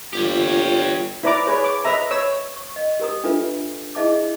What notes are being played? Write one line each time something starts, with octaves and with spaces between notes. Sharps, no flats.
G1 F4 G4 C#5
E4 B4 D5 A#5 D6
G#4 B4 C#5
D6
B4 D#5 E5 A#5
C#5 E6
C#6
D#5
G4 A#4 A#5 D#6
D4 F4 A4 B4 E5
E4 G#4 D#5 E5 A5 D6